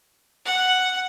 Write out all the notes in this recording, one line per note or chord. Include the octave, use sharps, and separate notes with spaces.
F#5